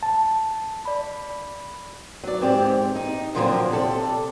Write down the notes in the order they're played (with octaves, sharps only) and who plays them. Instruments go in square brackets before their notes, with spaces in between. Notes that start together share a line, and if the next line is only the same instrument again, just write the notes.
[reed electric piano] A5
[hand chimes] D5 B5
[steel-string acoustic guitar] F#3 D5
G#2 C4 G4 D5
D#4
A#2 D3 F3 F#3 A#3 C4
C3 A4 D5